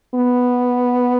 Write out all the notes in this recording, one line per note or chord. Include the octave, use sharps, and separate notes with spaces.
B3